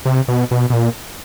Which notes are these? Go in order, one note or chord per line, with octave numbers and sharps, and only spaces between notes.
C3
B2
B2
B2
A#2